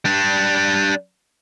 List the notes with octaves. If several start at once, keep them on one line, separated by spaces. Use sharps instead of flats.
G3 D4